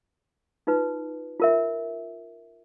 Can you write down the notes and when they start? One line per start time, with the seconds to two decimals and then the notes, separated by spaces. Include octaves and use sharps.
0.67 D#4 F4 B4
1.40 F4 A#4 E5